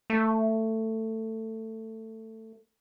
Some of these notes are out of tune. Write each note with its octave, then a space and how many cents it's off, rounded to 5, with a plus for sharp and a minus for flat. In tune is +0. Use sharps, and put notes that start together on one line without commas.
A3 +15